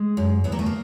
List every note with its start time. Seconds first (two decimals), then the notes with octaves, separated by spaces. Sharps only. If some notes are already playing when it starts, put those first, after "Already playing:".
Already playing: G#3
0.17 F#2
0.44 E2 B3
0.52 A#3
0.59 A3
0.66 A#3